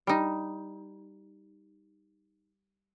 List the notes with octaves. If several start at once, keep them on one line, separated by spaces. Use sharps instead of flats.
G3 D#4